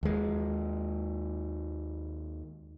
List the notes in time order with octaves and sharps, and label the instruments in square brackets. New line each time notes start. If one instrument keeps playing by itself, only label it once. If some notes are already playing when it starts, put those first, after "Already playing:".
[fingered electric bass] D#2 G#3